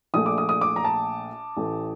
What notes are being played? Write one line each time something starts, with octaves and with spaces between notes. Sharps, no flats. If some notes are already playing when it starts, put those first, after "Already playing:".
A#1 A#2 A3 D#6
D6
D#6
D#6
D6
A#5
A5
A1 A2 A3